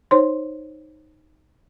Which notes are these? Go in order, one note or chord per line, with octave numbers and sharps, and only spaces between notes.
D#4 C5 C#5 C6